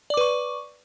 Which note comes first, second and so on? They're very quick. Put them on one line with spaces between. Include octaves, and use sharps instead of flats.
D5 D6 B4 C#6